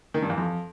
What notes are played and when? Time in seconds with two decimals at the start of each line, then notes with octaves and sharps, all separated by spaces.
0.14 D#3
0.22 G2
0.30 E2
0.38 F2